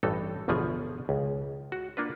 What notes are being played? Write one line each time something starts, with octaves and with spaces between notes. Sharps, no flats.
A1 G2 E3 D#4 A4
G1 E2 B2 F3 G#4 G#5
C#2
F#4
A#3 D4 F4 B4